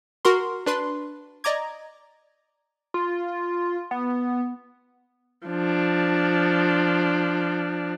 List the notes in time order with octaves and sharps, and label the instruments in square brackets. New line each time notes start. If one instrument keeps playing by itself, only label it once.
[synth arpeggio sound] F#4 A#4 C6
D4 B4 C6
D5 D#5 A#5 D6 G#6
[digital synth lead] F4
B3
[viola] F3 D4